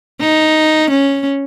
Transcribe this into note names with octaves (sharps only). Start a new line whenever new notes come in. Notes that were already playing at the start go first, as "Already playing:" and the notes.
D#4
C#4